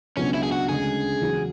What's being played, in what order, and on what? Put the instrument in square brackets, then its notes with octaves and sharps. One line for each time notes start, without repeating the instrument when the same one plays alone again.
[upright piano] C#2 B2 F#3 B3 D4 [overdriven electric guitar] C#4
[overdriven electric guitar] E4
G#4
F#4
[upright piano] D2 C#3 G#3 C#4 [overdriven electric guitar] G#4
[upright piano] E2 C#3 F#3 C#4 F#4